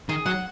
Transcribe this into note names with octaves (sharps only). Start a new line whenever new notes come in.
D#3 G#4
F#3 F#5